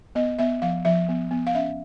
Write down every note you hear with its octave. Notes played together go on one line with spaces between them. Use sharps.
B3 D#5
B3 E5
F3 F5
F3 E5
B3
B3
F5
C#4 E5